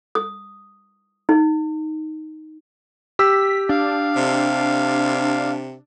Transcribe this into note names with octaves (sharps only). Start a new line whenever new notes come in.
D#6
D#4
G4 E6 B6
D4 F5
C3